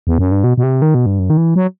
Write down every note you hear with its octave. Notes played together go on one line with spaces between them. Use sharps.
E2
F#2
G2
B2
B2
C3
D#3
B2
G2
F#2
D#3
E3
F#3